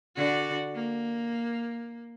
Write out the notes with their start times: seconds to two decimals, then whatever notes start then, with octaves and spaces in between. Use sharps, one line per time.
0.15 D3 F#4 D5
0.74 A#3